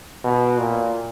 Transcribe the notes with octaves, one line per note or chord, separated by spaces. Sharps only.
B2
A#2